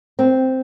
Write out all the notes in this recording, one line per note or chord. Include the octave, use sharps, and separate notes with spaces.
C4